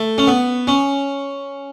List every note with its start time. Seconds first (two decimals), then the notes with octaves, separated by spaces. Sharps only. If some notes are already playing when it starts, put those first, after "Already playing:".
Already playing: A3
0.18 C#4
0.27 B3
0.67 C#4